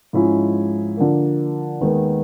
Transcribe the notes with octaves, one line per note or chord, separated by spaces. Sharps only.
G#2 F3 G#3 C#4 E4
D3 F3 A#3
D#2 D#3 G#3 B3